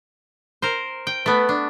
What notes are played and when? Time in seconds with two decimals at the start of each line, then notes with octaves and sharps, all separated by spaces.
0.62 A#4 C5
1.07 G5
1.26 A3 B3 B4
1.49 D4